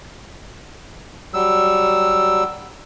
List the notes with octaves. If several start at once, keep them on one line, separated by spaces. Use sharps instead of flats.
F#3 G3 E6